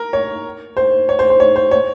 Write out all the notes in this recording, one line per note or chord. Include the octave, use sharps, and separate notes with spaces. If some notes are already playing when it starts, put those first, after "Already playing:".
Already playing: A#4
C#5
C5
C#5
C5
C5
C#5
C5
C#5